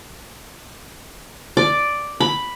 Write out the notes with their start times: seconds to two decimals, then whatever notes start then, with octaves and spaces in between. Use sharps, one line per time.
1.57 D5
2.20 B5